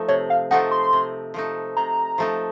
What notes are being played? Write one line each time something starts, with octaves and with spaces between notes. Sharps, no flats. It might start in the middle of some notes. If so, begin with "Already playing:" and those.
Already playing: F3 A3 D#4
C3 C#5
F5
F3 A3 D#4 F#5
C6
C3
F3 A3 D#4
C3 A#5
F3 A3 D#4